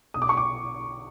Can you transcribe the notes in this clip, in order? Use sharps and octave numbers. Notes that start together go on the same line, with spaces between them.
B1 D#6
D6
C#6
D6